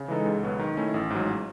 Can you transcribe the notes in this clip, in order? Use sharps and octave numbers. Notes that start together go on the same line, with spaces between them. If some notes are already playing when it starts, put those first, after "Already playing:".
Already playing: C#3
E3 G#3 D#4 A4
C#2
B2 F#3 B3
D#3
A3 C#4 E4
A1
G#2 F#3